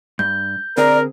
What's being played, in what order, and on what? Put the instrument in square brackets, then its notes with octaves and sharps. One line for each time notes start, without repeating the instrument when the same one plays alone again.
[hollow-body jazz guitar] G2 [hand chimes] G6
[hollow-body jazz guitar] D3 C4 G#4 [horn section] A#4 [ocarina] D5